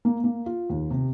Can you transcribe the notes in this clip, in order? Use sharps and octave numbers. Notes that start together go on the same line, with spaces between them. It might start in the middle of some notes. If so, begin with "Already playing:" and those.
A#3
A#3
F4
D#2
C3